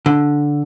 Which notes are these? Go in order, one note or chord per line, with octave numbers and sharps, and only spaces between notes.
D3